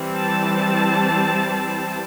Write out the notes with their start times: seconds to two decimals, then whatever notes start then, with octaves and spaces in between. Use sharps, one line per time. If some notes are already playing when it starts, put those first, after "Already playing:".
Already playing: E3 G3 C4
0.17 A5